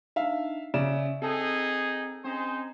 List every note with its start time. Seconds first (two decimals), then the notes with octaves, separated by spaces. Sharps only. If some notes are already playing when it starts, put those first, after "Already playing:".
0.16 D4 D#4 E5 F5
0.74 C#3 D5 E5 E7
1.22 C4 D#4 G#4 A4
2.25 C4 C#4 D#4 G#4 C5